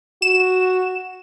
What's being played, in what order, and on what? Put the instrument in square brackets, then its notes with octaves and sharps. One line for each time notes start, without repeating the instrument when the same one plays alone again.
[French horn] F#4 [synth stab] E7